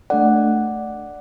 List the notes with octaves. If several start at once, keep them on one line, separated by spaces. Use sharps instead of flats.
A3 D4 A4 D5 F#5